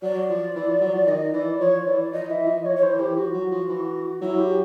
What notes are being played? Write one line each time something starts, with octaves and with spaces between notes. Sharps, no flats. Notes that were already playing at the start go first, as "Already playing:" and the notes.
F#3 D5
F3
E3
F3
F#3
F3
D#3 D#5
E3 D5
F3 C#5
E3 D5
F3 D#5
E3 E5
F3 D#5
F3 C#5
C#5
E3 C5
E3 G4
F3 F#4
F#3
F3
E3
F#3 E4
G4